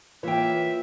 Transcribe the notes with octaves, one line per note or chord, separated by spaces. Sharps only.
E3 A#3 F4 B4 C#5 E5 G5